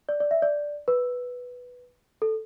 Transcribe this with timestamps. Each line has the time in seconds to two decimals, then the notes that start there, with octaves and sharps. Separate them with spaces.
0.09 D5
0.20 D5
0.31 E5
0.42 D5
0.88 B4
2.22 A4